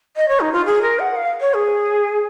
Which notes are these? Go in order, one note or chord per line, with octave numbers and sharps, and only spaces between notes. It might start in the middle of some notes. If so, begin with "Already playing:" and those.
D#5
C#5
D#4
F4
G#4
A#4
F#5
F5
C#5
G#4